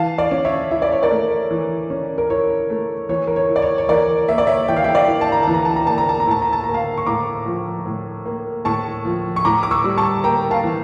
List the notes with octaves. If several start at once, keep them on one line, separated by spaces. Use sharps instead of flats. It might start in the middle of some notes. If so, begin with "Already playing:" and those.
Already playing: E3 F5 A5
D5 F5
C#4
C#5 E5
E4 E5
D5
C#5
A#4 D5
A3
E3
C#4
A#4
E4 C#5
A3
E3 C#5
A#4
C#5
E4
D5
C#5
C#5
E3 A#4 D5
A#3 E5
D5
C#5 E5
E3 G5
F5
E5 G5
D5 F5
E4
A5
A#5
E3 A5
A#5
A5
A#5
A#3 A5
A#5
A5
A#5
A2 A5
A#5
A5
A#3 A#5
F5 A5
C#6
A2 A#5 D6
F3
A2
A#3
A2 A5 C#6
F3
C#6
A2 A#5 D6
D6
C#6 E6
G3
A5 C#6
A#3 G5 A#5
F5 A5
E3